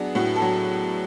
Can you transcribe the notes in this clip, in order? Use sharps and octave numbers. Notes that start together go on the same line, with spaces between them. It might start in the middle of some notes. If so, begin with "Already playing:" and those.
Already playing: F#3 B3 D4 G#4
A2 F#4
A4
F#3